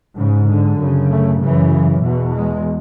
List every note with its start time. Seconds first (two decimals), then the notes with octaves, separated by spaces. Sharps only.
0.18 G#2 C#3
0.49 D3
0.79 F#2 C#3
1.10 A3
1.40 F#2 C#3 E3
2.02 E2 B2 E3
2.32 G#3